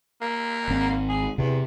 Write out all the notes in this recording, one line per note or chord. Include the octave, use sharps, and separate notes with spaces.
A#3
G#1 C4
G#4
E2 C3